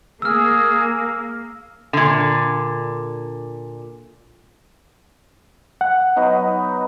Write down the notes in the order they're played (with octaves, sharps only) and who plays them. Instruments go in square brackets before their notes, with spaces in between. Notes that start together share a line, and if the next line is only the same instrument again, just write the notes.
[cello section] A#3 [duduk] G#4 [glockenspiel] E6 F6
[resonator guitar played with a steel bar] A#2 D3
[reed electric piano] F#5
[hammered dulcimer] F#3 B3 D#4